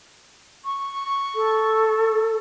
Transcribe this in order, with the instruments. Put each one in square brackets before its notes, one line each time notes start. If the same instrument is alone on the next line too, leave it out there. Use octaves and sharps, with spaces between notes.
[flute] C#6
[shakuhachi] A4